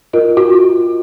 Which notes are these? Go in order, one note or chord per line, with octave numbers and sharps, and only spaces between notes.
F4 A#4 D#5
F4 F#4